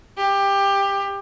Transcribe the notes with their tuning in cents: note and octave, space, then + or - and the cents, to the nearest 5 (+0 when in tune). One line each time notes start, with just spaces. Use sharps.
G4 +15